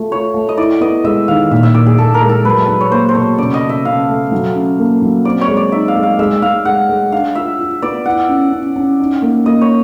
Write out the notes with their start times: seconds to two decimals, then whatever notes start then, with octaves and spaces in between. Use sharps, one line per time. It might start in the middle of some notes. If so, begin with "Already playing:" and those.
Already playing: A3 F4
0.11 F4 C#5
0.34 A3
0.49 D#5
0.57 E4 D5
0.81 B3 D#5
1.04 G#3 E5
1.28 D#3 F5
1.51 A#2 E5
1.63 E5
1.74 A#2 D5
1.86 G#4
1.98 A#2 A4
2.14 A#4
2.21 G#3
2.29 A4
2.45 F#3 B4
2.68 F#3
2.81 C#5
2.91 A#3 C5
3.09 C5
3.15 B2 C#5
3.38 C#3 D5
3.54 D#5
3.62 C#3
3.69 E5
3.85 C#3 F5
4.08 A3
4.32 F#3
4.55 C#4
4.79 A#3
5.02 F#3
5.25 C4 D5
5.41 C#5
5.48 G#3
5.57 D5
5.72 D#4 E5
5.88 F5
5.96 G#3
6.03 F5
6.19 G#3 E5
6.42 G#3 F5
6.65 G#3 F#5
6.89 G#3
7.12 D4 F5
7.35 F4 E5
7.59 F4
7.82 B3 D5
8.05 E4 F#5
8.29 C#4
8.53 C#4
8.76 C#4
9.00 D#4
9.22 A#3
9.46 A#3 D#5
9.61 C#5